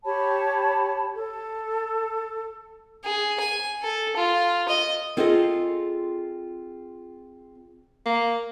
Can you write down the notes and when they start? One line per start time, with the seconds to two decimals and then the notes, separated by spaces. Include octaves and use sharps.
0.05 G4 C#5 A5 B5
1.15 A4
3.05 G#4
3.40 G#5
3.83 A4
4.16 F4
4.69 D#5
5.17 C4 F4 G#4 A4 D5 D#5
8.06 A#3